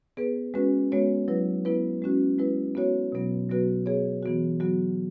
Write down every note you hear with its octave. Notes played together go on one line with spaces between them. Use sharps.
B3 G#4 B4
G#3 C#4 F#4 B4
G#3 B3 F#4 C#5
F#3 E4 B4
B3 E4 B4
G#3 C#4 F#4
G#3 E4 B4
B3 F#4 C#5
B2 F#3 B3
B2 F#3 B3 F#4 B4
B3 G#4 C#5
E3 B3 F#4
F#3 B3 F#4